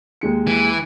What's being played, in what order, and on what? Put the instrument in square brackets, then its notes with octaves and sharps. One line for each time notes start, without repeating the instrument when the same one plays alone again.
[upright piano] D#2 G#3 C#7
[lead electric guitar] E3